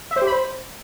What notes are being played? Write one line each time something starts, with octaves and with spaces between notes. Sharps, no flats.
E5
C5
G4
B5
C5